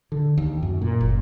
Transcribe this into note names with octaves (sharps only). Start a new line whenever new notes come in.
D3
D#2
F#2
A#2
F#1